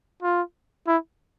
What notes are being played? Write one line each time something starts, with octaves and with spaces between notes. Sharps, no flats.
F4
E4